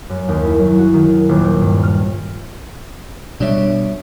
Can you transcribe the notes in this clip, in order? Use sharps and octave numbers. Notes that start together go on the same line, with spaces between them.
F#2
D#2
E4
F#3
F#4
D#3
D#1
G5
G2
F6
B2 G3 D4 C#5 E5